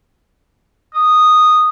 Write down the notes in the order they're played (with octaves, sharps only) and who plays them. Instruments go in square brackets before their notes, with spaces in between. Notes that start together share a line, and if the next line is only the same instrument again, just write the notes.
[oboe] D#6